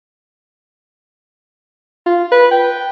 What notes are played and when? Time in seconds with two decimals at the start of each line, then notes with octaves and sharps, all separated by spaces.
2.06 F4
2.32 B4
2.51 G5